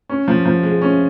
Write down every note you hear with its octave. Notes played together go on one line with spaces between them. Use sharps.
C#4
F3
F3
G#3
C#4